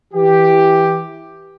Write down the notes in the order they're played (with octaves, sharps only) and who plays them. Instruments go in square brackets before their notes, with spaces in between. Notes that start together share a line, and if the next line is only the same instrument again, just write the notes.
[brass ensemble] E3 G4